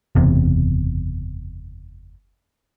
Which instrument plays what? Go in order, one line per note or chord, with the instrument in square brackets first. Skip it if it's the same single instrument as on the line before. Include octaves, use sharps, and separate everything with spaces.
[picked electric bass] F#1 E2 C3